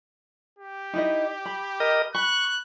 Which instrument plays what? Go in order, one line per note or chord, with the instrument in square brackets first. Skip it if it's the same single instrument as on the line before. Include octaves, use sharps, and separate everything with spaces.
[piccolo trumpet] G4
[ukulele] D#4 E4 D#5
B5
[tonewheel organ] A#4 D#5
[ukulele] B5 [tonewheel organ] C#6 [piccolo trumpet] F#6